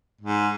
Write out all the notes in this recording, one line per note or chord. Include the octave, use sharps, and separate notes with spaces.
G#2